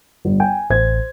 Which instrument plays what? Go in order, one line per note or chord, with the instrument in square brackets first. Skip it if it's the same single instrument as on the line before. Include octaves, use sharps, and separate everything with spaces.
[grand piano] G1
[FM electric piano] G5 [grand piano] G#5
[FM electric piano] A1 [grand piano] C5 G#6